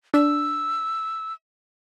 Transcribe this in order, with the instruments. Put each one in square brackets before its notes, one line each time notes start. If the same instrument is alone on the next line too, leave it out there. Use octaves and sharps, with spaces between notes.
[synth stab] D4 [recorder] E6